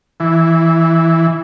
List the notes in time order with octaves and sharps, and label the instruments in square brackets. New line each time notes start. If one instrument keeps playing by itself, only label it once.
[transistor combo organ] E3